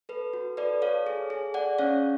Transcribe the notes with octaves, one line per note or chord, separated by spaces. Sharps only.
A4 B4
F#4
A4 B4 D5
A4 C#5 F5
G#4
G#4
G#4 D5 F#5
C#4 C#5 F5